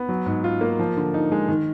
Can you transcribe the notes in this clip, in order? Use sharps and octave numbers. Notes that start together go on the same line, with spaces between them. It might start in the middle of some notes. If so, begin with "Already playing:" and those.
Already playing: B3
F#3
G#2
F4
A#3
F3
D3
D#4
G#3
D#3